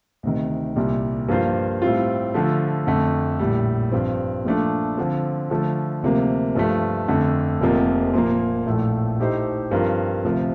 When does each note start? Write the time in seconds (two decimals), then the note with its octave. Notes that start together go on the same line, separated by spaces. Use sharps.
0.23 D2 C3 D#3
0.76 C2 A#2 G3
1.28 G2 F3 A#3 F4 C5
1.82 A2 G3 C4 F4
2.34 D3 F3 A3
2.87 F2 D3 A3
3.39 A#1 A2 G3
3.92 G2 F3 C4
4.45 A#2 F3 A3 D4
4.97 D3 F3 C4
5.50 D3 F3 A3
6.03 D2 C3 F3 A#3
6.55 G2 F3 A3
7.08 F2 D3 A3
7.61 F1 F2 C3 F3 A#3
8.14 A#2 F3 A#3
8.66 A#1 A2 F3 A3
9.19 A2 A3 D#4 G4 C5
9.71 G2 F3 C4 F4 A#4
10.24 D2 C3 F3